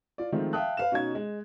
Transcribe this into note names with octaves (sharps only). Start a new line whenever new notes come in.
F4 D5
D#3 F3 G#3 A3 C4 F4
E5 F5 G5 A5 D#6 F#6
B4 F5 E7
B2 C#4 D#4 G#6
G#3